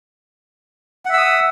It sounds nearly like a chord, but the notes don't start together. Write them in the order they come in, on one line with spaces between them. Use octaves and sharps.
F#5 E5 E6 D#6